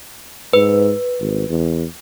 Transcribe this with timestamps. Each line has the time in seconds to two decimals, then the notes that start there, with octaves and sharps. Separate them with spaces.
0.53 G#2 B4
1.19 G#1
1.49 E2